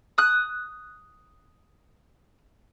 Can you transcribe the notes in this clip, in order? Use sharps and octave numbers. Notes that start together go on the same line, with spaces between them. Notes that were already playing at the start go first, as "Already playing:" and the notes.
D#6 F#6